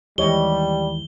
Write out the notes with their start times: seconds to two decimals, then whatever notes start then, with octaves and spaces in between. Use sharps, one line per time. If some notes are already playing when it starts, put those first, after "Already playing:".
0.18 D#2 E3 G3 G#3 G4 C#5 D#5 G7